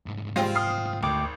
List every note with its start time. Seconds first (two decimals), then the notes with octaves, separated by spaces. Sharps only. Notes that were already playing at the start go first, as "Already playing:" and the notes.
0.06 C2 G#2
0.36 G3 G#3 C4 F4
0.56 D#6 F6 C7
1.03 G#1 D2 G5 D6